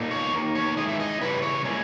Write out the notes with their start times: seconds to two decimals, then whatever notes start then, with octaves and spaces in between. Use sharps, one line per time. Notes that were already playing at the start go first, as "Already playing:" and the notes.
Already playing: A#2 A#3 D#4
0.11 C#5
0.33 D#3 A#3 D#4
0.55 C#5
0.76 D#3 G#3 C#4 E4 D#5
0.89 E5
1.00 D#5
1.21 C#3 G3 C#4 E4 B4
1.42 C#5
1.64 A#2 G#3 C#4 E4